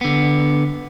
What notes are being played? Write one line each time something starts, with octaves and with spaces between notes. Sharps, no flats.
D3 B3